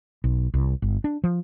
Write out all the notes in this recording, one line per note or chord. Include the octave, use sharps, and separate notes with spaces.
B1
C2
G1
D4
F3